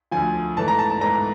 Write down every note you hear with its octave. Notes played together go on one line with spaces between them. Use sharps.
D2 D3 F3 G#5
G#2 E3 A3 A5
A#5
A5
A5
G#2 E3 A3 A#5